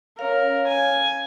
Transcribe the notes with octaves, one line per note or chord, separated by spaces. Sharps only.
C#4 A#4 C#5 F5
G#5